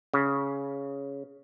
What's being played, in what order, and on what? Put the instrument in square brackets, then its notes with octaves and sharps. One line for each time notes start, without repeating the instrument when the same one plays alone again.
[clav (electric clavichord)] C#3